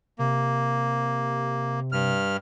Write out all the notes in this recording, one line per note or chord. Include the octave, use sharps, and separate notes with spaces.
C3 A#3
G2 F6